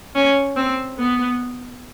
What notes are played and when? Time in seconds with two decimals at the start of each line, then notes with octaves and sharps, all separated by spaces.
0.15 C#4
0.56 C4
0.98 B3